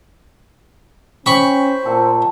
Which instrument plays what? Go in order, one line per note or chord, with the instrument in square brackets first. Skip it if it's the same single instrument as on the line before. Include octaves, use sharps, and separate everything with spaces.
[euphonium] C#4 [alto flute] C5 [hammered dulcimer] G5 [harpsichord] B5 C#6
[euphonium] A#2 [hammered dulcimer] A4